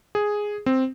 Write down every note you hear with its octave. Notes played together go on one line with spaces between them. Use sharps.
G#4
C4